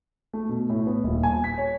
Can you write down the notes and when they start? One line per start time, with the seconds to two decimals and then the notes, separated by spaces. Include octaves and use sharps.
0.33 A3
0.49 B2
0.70 A2
0.87 B3
1.04 D#1
1.23 G#5
1.44 B6
1.58 C#5